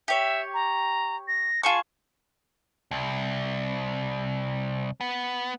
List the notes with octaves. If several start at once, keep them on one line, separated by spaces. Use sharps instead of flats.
G4 C#5 E5
A#5
A#6
F4 G#4 A5 C#6
C2
B3